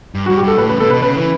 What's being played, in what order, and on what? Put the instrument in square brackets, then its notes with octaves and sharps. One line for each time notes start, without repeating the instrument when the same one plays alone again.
[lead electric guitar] G2
[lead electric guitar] G2 [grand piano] F#4
[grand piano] G4
[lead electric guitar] G2 [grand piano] A4
[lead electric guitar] A2 [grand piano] B4
[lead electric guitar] C#3 [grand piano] B4
[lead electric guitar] B2 [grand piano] A4
[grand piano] B4
[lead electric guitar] B2
[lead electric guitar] C#3 [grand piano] B4
[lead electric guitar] E3